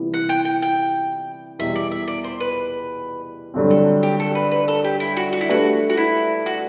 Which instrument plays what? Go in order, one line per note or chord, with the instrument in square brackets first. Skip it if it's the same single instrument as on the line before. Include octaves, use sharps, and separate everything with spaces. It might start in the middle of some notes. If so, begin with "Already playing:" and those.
Already playing: [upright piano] C3 E3 G3 B3
[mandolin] F#5
G5
G5
G5
[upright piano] E2 B2 G3 [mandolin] E5
[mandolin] D5
E5
D5
C5
B4
[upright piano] G2 D3 F#3 C4
[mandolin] A4
G4
A4
B4
B4
A4
G4
E4
F#4
F#4
E4
[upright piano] A3 D4 G4 B4 E5 [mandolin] F#4
[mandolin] F#4
E4
F#4